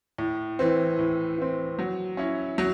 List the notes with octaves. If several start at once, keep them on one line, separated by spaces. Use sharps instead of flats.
A2
E3 C4
A2
E3 C4
F#3
C#4 E4
F#3